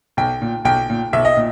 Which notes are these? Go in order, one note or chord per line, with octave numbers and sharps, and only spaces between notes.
B1 G5
A#2
B1 G5
A#2
B1 E5
D#5
A#2